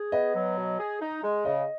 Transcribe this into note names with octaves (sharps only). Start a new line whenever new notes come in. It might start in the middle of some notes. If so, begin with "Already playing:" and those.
Already playing: G#4
B3 D#5
F#3
B2
G#4
D#4
G#3
C#3 D#5